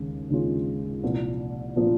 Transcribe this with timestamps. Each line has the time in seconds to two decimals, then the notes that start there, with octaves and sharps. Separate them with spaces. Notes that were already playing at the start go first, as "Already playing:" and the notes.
Already playing: D#2 C#3 G#3 C#4
0.30 D#2 C#3 G#3 C#4 F4
1.03 C2 A#2 F3 A#3
1.76 A#2 F3 A#3